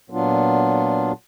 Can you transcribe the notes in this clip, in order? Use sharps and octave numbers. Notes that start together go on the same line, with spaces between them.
A#2 F#3 B3 D4 F4